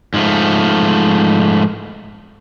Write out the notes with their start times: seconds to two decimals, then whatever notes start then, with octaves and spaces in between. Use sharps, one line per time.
0.14 G#2 F3 A3